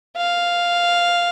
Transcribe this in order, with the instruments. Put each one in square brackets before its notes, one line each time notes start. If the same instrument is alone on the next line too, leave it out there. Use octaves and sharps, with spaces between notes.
[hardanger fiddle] F5